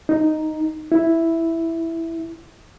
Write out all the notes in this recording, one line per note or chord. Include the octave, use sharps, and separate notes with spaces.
D#4
E4